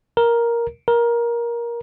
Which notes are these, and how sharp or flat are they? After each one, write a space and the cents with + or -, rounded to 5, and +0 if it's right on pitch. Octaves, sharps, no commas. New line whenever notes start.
A#4 +5
A#4 +15